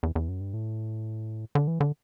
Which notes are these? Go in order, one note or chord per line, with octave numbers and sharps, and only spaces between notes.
E2
E2
F#2
G2
A2
D3
E3
D3